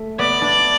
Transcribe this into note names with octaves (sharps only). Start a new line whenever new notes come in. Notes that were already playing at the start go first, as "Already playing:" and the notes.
Already playing: A3
B3 D5
D4